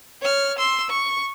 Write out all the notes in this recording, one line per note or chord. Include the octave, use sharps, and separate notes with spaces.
C#5 F6
C6 E6
C#6